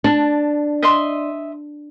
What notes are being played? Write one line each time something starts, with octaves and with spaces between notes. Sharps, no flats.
D4 A5
D#5 E5 C6